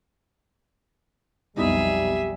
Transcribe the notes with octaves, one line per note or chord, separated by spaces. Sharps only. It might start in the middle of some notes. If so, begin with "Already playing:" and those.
B1 F2 B2 G3 D#4 G#4 E5 D#6